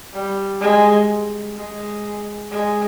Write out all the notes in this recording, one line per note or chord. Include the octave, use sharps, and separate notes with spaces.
G3
G#3
G#3
G#3